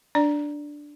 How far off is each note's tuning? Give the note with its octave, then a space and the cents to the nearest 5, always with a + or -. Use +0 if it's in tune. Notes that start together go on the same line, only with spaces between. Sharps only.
D4 +0 D5 +0